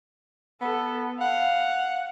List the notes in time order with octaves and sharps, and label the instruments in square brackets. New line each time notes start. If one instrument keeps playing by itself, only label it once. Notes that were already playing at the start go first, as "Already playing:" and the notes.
[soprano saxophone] B3 [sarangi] A4
[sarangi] F5 [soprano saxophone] F#5